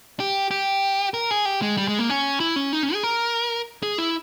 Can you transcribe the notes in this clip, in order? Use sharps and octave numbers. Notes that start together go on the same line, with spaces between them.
G4
G4
A#4
G#4
G4
G#3
G3
G#3
A#3
C#4
E4
C#4
D#4
C#4
G#4
A#4
G#4
E4